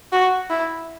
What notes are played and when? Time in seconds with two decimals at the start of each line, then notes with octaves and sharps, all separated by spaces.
0.12 F#4
0.50 E4